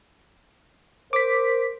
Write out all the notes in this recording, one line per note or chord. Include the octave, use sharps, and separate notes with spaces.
A#4 C5 D6 B6